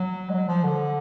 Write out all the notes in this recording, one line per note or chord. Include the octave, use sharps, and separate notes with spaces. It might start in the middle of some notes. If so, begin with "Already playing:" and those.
Already playing: F#3
G#3
F#3
F3
D3